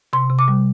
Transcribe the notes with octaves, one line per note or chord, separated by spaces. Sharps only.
C3 C6
C3
D6
G3